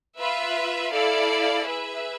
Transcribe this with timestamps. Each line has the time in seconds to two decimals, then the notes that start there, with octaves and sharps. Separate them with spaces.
0.18 F4 B4 E5
0.92 E4 A4 D5 F5
1.66 G#4 B4 E5